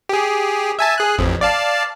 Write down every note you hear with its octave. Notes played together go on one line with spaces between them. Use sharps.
G4 G#4
E5 G#5 A5
G#4 F#6
A1 F2
D5 F5 A5